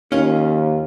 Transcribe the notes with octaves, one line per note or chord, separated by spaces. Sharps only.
D#2 C#4 F4